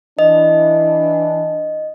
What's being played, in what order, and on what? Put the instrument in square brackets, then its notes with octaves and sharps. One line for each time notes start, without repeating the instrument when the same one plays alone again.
[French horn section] E3 D4 [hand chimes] D#5